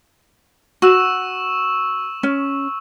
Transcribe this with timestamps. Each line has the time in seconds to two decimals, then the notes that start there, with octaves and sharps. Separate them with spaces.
0.82 F#4 C#6 E6 E7
2.23 C#4